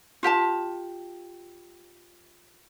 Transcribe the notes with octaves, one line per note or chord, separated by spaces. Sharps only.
F4 G4 G5 A5